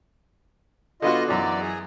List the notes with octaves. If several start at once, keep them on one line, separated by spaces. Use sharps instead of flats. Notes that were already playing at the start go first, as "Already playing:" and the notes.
D3 B3 F4 F#4 D#5
F#2 E3 B3 D5
G#4